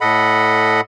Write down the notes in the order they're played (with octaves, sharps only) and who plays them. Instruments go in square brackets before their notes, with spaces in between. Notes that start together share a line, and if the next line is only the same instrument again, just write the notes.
[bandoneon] A2 A4 D#5 F#5 B5